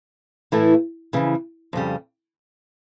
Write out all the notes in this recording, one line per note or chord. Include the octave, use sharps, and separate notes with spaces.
A2 E3 A3 E4
F2 C#3 E3
F2 C#3 G3